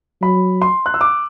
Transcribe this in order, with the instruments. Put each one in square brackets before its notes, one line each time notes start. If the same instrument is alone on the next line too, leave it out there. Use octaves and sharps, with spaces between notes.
[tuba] F#3 [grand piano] B5
[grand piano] C6
F#6
E6
D6